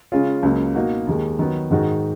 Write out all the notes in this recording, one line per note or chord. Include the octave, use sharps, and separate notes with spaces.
C#3 G#3 C#4 F4
C#2 C#3 F#3 A#3
B2 A#3 D#4 F#4
D#2 D#3 G#3
D#3 F#3 B3
G#2 D#3 G#3 D#4 F#4